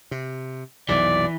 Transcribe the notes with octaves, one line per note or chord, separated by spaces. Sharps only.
C3
B1 F2 C3 E3 D5